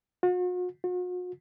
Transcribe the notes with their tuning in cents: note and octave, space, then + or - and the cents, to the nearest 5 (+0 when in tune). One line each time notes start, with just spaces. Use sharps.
F#4 -45
F#4 -45